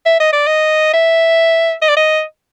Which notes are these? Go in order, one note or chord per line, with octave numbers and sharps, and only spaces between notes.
E5
D#5
D5
D#5
E5
D#5
D5
D#5